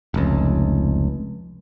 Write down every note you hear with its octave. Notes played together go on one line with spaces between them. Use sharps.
F1 C#2